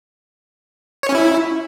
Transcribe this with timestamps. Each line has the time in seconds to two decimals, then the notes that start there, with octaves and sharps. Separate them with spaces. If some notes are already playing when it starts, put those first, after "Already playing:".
1.03 C#5
1.09 C#4
1.15 E4